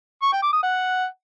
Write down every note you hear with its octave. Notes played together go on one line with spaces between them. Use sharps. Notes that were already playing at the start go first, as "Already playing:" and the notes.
C#6
G5
D6
D#6
F#5